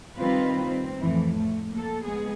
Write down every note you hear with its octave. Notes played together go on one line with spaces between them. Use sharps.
D#3 G3 C4 F4 B4
C4
F2 A2 E3
A3
A#3 A4
G#3 B3 G#4